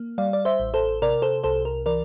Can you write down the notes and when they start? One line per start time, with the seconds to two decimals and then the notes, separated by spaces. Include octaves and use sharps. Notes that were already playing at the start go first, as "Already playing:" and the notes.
Already playing: A#3
0.18 G3 D5 F5
0.33 D5
0.45 C5 E5
0.60 A1
0.74 A4 C5
1.02 C3 A#4 D5
1.22 A4 C5
1.44 C2 A4 C5
1.65 A#4
1.86 E3 A#4 D5